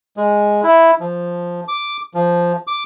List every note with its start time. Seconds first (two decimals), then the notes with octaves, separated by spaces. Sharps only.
0.17 G#3
0.63 E4
1.00 F3
1.68 D6
2.14 F3
2.67 D6